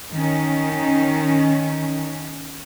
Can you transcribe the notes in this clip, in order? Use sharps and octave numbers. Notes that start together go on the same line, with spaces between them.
D#3 C#4